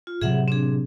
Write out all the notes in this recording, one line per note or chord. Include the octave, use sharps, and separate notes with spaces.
F4
A2 C3 F#3 G#4 E5 F#5
C4 D4 G#4